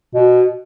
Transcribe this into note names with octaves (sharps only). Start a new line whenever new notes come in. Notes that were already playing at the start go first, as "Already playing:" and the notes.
B2